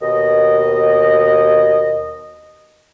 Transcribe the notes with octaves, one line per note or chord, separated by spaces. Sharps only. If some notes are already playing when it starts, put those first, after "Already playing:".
D#2 B2 D#5